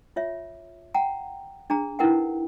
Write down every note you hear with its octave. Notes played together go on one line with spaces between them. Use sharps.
F4 C#5 E5
F#5 G5 A#5
D4 G#4 A#5
D#4 E4 A#4 B4 F#5 G5